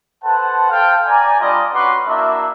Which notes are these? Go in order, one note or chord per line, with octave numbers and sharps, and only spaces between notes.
A4 B4 C5 F#5 A5
A4 C5 F5 G5
D5 G#5 A#5
G3 D4 F4 D5 D#5
C#4 F#4 B4 F#5 C6 D6
A#3 D4 E4 F#4 A#4 E5